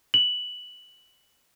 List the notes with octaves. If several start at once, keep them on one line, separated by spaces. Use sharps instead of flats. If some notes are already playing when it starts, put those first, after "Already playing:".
F#7